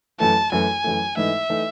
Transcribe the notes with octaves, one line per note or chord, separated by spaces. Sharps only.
F#2 E3 A3 A5
F#2 E3 A3 G#5
F#2 E3 A3
G#2 E3 A3 D#4 E5
E3 A3 D#4